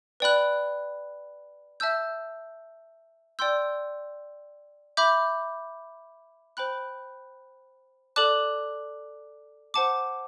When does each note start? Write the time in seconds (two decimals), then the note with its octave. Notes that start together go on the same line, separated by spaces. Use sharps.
0.20 B4 D5 G5 B5 F#6
1.80 E5 A5 E6 G6
3.39 D5 G5 C6 E6 G6
4.97 E5 B5 D6 G6
6.57 C5 G5 B5 F#6
8.16 A4 D5 A5 D6 F#6
9.74 C5 F#5 A5 D6